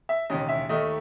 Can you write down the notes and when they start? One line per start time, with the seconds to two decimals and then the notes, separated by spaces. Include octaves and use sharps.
0.09 E5
0.30 E1 D#2 C#3 G#3 D#5
0.49 E5
0.69 D#2 D#3 A3 D#5